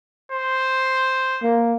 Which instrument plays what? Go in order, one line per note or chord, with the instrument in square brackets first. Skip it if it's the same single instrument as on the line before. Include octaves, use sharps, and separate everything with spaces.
[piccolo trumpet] C5
[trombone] A#3